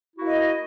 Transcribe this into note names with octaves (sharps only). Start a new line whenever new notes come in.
A#3 E4 F#4 D#5